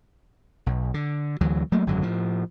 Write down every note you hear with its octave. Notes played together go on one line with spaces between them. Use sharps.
B1
D3
D2 E3 F#3
F#3 A3 A#3
G#1 F#2 D3 F#3
A2 F3